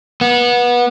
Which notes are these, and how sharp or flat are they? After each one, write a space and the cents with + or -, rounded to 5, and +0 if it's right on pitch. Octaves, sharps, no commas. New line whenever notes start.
B3 -25